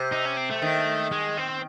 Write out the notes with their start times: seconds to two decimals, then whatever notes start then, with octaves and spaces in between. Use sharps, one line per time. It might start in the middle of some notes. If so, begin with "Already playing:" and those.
Already playing: C3
0.12 D#4
0.25 C#4
0.37 C4
0.50 A3
0.62 D#3
1.12 G#3
1.37 C4